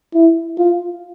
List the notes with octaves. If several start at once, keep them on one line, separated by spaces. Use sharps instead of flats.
E4
F4